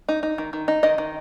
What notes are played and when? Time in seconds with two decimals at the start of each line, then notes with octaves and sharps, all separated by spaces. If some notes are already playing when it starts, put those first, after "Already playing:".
0.09 D#4
0.23 D#4
0.38 D#3
0.53 D#3
0.68 D#4
0.83 D#3 D#5
0.98 D#3